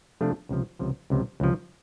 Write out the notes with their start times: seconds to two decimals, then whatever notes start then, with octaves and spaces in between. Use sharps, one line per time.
0.21 C3 F3 A3 D4 F4
0.49 C#2 C3 F3
0.79 C#2 C3 F3
1.10 C#2 C3 F3
1.40 C#2 C3 F3